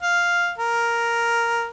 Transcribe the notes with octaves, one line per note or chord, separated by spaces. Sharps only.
F5
A#4